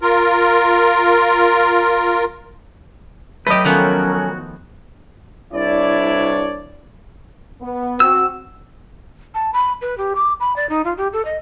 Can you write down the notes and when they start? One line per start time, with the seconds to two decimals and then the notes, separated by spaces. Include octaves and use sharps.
0.01 F4 A#4
3.47 F#3 A3 G4 B4 D#5
3.65 D#3 F3 B3 C#4 F#4 A4 A#4
5.52 C2 D4 E4 C#5 D5
7.61 B3
8.00 C4 F#4 E6
9.35 A5
9.53 B5
9.81 B4
9.98 G4
10.15 D6
10.40 B5
10.56 D5
10.69 D#4
10.85 F4
10.97 G4
11.13 A4
11.25 D#5